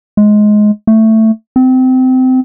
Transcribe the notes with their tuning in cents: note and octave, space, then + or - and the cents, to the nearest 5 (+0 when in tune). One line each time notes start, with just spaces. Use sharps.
G#3 +15
A3 +10
C4 -25